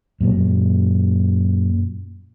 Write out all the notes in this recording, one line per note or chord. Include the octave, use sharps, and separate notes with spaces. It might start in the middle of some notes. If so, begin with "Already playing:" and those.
F#2 A#2 F#3